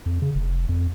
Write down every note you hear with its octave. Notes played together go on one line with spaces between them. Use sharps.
F2
C#3
F1
F2